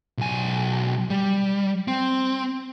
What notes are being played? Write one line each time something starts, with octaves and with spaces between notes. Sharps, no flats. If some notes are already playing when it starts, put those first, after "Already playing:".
B1 G#5
G3
C4